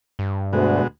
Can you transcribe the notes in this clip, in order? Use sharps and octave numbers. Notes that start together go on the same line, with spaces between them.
G2
D2 B2 G#3 F#4